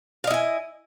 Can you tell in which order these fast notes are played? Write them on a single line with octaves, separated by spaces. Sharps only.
F5 D#5 E4 G#5